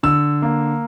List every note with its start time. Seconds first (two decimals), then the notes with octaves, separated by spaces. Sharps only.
0.03 D3 E6
0.42 A#3